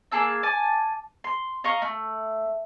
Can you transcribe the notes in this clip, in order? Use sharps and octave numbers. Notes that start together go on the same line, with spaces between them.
A#3 G#4 A5 E6
G#5 A5 D6
C6
D#5 F5 A#5 C#6
A3